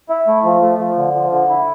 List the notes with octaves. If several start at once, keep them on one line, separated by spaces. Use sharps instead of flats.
E4
A3
F3
A3
F3
D3
F3
D3
E4